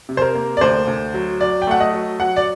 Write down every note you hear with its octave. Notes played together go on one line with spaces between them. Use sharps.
C3
C5
A#4
A#3
D5
D2 C5
D2
F#3
F#3 D5
G5
A3 F#5
D#5
F#3
F#3 F#5
D5